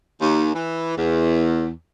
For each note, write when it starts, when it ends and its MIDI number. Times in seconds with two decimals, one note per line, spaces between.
0.20 0.50 39
0.54 0.96 52
0.97 1.69 40